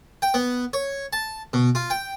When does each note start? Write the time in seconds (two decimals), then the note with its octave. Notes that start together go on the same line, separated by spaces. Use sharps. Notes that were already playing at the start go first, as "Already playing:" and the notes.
0.22 G5
0.34 B3
0.73 C#5
1.13 A5
1.53 B2
1.75 F4
1.90 G5